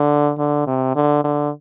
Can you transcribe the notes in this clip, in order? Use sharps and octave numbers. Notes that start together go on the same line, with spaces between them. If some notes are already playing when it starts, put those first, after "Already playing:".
Already playing: D3
D3
C3
D3
D3